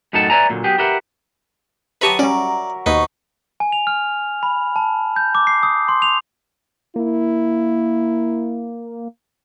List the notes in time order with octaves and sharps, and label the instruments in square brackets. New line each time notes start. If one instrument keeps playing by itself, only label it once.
[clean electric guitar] F#2 A2 D#4 A4 F#5 A5
B4 C#5 D5 E5 G#5 A#5
A#2 D3 F#3
F#3 B3 G4 G#4
G4 A#4 B4 E5 F#5
[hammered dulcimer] F#3 E5 [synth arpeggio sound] G4 A5 A#5 [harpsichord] B4 C#6 D#6
[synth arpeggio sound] G3 C#4 [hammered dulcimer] F#4 A#4 [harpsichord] D5
[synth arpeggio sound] D#2 [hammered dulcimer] B2 F3 C#6 [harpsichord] D#4 B4
[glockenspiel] G#5
F7
F6
B5
A5
G6
D6
C7
D#6
C6
F7
[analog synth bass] A#3 [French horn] E4